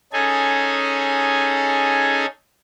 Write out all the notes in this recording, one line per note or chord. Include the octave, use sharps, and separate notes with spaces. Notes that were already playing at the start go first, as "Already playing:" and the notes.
C#4 D#4 G#4 A4 G#5